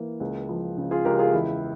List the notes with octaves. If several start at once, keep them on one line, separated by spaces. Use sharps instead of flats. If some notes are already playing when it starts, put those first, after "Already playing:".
Already playing: E3 A#3
C#2
F3
C#3
F4 G#4
C#2 G4 A#4
F4 G#4
E2 E4